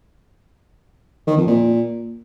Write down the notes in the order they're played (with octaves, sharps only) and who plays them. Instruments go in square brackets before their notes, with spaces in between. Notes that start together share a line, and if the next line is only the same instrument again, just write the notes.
[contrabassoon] D#3
F2
A#2